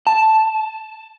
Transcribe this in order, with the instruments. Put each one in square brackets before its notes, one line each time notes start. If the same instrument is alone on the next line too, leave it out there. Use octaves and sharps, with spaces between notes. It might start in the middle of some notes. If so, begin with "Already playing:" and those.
[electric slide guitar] A5